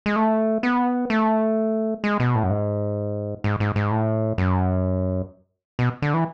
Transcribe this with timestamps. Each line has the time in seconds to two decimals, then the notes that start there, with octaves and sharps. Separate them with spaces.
0.06 G#3
0.16 A3
0.63 B3
1.10 A3
2.04 G#3
2.20 B2
2.35 A2
2.43 F#2
2.50 G#2
3.44 G#2
3.60 G#2
3.76 G#2
3.91 A2
4.38 F#2
5.79 B2
6.02 D3
6.14 E3